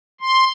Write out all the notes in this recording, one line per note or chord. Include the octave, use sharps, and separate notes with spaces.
C6